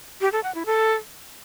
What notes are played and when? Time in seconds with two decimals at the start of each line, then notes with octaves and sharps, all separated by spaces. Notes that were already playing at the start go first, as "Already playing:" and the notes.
0.21 G4
0.32 A4
0.43 F#5
0.55 E4
0.66 A4